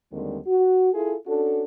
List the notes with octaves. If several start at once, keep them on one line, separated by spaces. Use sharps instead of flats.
D#2 D3 D#3 G3 G#3 C4
F#4
E4 F4 G#4 A4
C#4 D4 F#4 A4